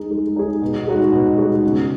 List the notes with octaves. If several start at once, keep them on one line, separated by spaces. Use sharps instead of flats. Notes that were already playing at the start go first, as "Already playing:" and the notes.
Already playing: G#3 D#4 G#4
G#3
D#4 G#4
B2
G#3 D#4 F#4
B2
G#3 D#4 F#4
C#3